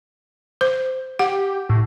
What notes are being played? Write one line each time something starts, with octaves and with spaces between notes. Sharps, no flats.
C5
G4 F#5
A2